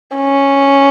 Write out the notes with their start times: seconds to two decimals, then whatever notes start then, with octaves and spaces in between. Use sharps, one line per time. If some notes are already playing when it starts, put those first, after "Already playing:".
0.17 C#4